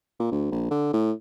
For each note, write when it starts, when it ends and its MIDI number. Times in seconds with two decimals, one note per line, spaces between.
0.20 0.29 46
0.32 0.47 38
0.51 0.69 34
0.71 0.91 50
0.93 1.12 45